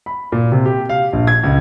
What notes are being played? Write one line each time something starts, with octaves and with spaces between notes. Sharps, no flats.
B5
A#2
C3
G4
F5
A#1
G#6
C#2